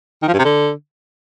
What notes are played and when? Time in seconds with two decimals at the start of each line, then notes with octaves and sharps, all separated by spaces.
0.22 D#3
0.28 F3
0.33 G2
0.39 C3
0.44 D3